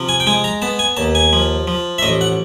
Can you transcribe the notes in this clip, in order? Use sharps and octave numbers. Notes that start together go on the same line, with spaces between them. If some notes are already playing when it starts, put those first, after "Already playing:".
Already playing: C3 F3
G#5
G5
G#3 G#5
A#5
B3 A5
G#5
D#2 A5
G#5
F3
F3
E5
A1 D#5
F#5